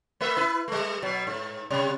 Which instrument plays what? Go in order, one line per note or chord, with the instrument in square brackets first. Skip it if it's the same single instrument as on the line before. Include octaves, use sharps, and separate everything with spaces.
[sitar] A3 B4 E5
E4 B4
G3 A3
B2 F#3
G#2
C3 G3